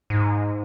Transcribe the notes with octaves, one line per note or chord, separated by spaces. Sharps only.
G#2